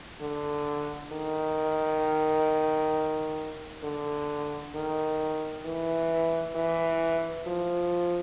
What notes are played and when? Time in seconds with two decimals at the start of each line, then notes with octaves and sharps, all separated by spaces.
0.21 D3
1.12 D#3
3.83 D3
4.75 D#3
5.66 E3
6.56 E3
7.47 F3